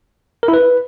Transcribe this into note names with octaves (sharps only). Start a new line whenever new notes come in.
A#4
E4
B4